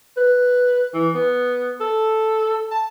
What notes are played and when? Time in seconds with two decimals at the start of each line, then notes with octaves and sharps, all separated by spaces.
0.17 B4
0.94 E3
1.15 B3
1.80 A4
2.71 A5